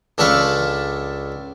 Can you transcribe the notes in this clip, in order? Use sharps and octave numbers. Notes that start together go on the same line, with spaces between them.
C#2 D4 A4 E5 F5 C#6